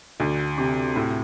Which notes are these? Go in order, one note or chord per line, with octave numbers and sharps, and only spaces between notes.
D2
C3
A2